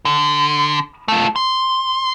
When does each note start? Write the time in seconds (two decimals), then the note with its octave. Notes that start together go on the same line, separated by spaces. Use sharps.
0.05 D3
1.08 A3 F4
1.36 C6